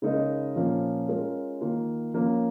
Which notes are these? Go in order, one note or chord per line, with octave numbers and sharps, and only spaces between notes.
C#3 G#3 D#4 A#4 D#5
A#2 F3 A#3 C#4 F4
G#3 C#4 F4 A#4
D#3 A#3 F4
F3 A#3 C#4 F4